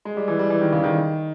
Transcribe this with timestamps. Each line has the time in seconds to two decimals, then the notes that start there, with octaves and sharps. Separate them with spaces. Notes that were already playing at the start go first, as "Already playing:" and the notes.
0.05 G#3
0.17 G3
0.28 E3
0.39 G3
0.50 E3
0.62 D#3
0.73 C#3
0.84 D#3